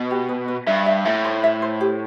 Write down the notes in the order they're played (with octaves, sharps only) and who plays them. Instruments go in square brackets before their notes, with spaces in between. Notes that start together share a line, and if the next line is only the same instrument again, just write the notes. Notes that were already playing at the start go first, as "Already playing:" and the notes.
Already playing: [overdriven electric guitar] B2
[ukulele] G4
B4
B4
[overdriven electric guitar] G2 [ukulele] E5
[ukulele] E5
[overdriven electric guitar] A2 [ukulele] E5
[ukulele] C5
E5
C5
G4